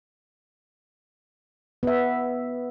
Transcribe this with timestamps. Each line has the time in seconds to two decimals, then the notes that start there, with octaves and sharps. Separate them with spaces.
1.83 B3 E5